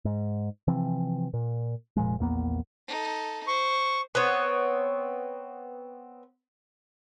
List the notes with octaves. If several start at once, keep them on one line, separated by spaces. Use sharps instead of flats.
G#2
C3 E3 F3 C4
A#2
F1 A#2 F3 G#3
A#1 E2 A#3 B3
D#4 A4
C5 C#6
B3 C4 C#5